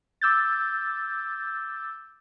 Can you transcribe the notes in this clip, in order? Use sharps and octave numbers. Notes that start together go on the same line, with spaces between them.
D6 E6 G6 A6